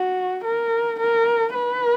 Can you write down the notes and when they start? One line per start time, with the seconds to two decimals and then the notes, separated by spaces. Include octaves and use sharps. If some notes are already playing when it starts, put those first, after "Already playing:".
Already playing: F#4
0.44 A#4
1.00 A#4
1.54 B4